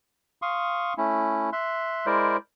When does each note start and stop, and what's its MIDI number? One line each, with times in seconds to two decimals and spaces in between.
0.42 0.94 77
0.42 0.94 84
0.42 0.94 85
0.42 0.94 87
0.98 1.50 57
0.98 1.50 61
0.98 1.50 64
1.53 2.06 76
1.53 2.06 84
1.53 2.06 90
2.06 2.37 56
2.06 2.37 64
2.06 2.37 70
2.06 2.37 72
2.06 2.37 74